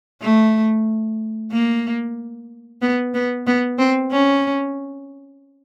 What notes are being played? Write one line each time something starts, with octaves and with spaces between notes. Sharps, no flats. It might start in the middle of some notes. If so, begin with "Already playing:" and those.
A3
A#3
B3
B3
B3
C4
C#4